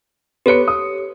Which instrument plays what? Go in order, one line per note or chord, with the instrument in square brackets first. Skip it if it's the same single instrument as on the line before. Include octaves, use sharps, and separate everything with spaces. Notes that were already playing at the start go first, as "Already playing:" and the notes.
[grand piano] B3 C#7 [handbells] G4 A4 C#5
[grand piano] D#6